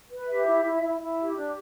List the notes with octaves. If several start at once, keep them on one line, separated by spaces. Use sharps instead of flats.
B4
G4 E5
E4
E4
E4
E4
G4
D4